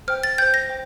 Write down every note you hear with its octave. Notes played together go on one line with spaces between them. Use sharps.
C5 G5 F6
A6
C5 G5 G6
A#6
C5 G5